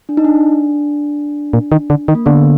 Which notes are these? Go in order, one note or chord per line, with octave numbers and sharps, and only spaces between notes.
D4
D#4
D4
A#2
D#3
D3
D#3
A#3
D3 B3